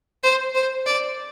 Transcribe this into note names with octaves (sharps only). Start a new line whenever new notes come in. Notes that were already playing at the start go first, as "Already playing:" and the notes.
C5
C5
D5